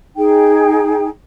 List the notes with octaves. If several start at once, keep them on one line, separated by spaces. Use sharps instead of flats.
D#4 G#4 G5